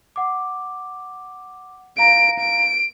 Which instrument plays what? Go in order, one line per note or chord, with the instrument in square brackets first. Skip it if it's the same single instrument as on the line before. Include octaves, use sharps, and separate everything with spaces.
[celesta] F#5 D6
[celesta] F5 A#5 A#6 [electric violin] D7
[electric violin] D7